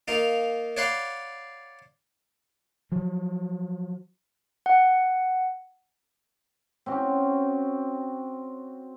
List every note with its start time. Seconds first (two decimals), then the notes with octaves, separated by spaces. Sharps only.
0.08 A#3 D#4 F4
0.77 C#5 D5 F5 F#5 B5 C6
2.92 F3 F#3
4.66 F#5
6.86 C4 C#4 F#4